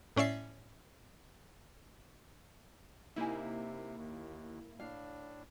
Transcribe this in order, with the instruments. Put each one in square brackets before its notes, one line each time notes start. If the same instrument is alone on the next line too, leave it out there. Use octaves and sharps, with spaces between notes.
[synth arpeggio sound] A2 C#4 D5 E5 C7
[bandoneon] C3 [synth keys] A#3 E4 [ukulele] D#4 G#5
[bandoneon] D#2
[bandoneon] A2 D4 [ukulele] F5